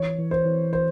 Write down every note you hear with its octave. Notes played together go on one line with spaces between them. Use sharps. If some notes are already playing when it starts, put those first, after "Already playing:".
Already playing: E3 C#5
E3
C5
E3
C5